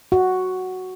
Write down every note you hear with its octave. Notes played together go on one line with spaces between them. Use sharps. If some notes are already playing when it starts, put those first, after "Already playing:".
F#4